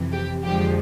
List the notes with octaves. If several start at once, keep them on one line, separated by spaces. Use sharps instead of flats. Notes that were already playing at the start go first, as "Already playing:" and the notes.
Already playing: F2 C3 E3
G4
F2 D3 F3 G#3 G4